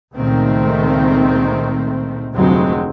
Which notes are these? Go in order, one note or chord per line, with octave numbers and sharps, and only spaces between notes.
C#2 A#2 D#3 A3 C4
F1 D2 F#3 G#3 C4